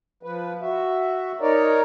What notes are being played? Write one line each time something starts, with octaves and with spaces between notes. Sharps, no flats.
F3 B4
F#4 E5
D#4 A#4 C#5 D5